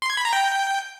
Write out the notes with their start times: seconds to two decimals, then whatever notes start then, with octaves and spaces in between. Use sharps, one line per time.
0.02 C6
0.10 G#6
0.17 B5
0.25 A#5
0.33 G5